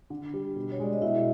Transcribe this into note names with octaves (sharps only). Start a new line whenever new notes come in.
D3
G3
B2
C#5
G#3 D5
D#5
B2 E4 E5